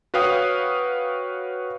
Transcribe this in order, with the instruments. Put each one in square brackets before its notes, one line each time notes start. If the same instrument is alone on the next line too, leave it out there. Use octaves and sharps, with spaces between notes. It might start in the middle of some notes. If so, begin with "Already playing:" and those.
[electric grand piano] F#4 B4 C#5 F5 G5 D#6